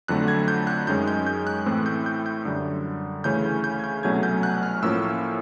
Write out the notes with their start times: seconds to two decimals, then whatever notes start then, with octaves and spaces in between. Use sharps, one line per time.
0.08 F2 D3 F#3 A3 F#6
0.28 G#6
0.48 G6
0.67 F#6
0.87 F#2 D#3 G#3 C#4 G6
1.08 G6
1.27 G6
1.47 F#6
1.66 A2 E3 A3 C4 F#6
1.86 G6
2.06 G6
2.26 G6
2.45 F#2 D3 G3
3.24 D2 C#3 E3 A3 C#4 G6
3.44 G6
3.64 G6
3.79 G#6
3.84 G6
4.03 C2 B2 F#3 A3 C#4 G#6
4.23 G6
4.43 F#6
4.63 F6
4.82 A2 F3 A#3 C#4 E6